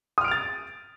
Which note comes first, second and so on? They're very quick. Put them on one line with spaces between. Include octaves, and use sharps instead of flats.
D#6 F6 D7 F7 A6